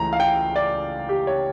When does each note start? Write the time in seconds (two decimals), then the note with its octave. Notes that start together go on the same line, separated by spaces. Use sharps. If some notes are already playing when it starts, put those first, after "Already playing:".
Already playing: C#2 C#3 E3 A3 C#4 A#5
0.13 F5
0.20 G5
0.56 D5
1.09 G4
1.27 C#5